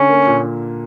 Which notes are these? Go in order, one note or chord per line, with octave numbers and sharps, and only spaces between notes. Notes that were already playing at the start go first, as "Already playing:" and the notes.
Already playing: D3 C#4
A#3
A#2